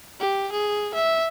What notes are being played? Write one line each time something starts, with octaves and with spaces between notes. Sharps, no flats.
G4
G#4
E5